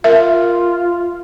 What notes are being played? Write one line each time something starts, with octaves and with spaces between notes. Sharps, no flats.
F4 A#4 E5